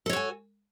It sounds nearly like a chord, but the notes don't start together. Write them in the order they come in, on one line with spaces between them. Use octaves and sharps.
A4 C#5 F#4 G#5